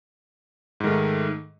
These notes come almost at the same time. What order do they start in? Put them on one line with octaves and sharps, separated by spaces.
G#2 D#3 A3